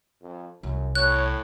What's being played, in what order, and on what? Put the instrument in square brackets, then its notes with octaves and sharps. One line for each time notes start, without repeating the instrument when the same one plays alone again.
[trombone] F2
[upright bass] C2 [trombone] F#2
[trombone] A2 [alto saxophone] C#5 [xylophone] F#6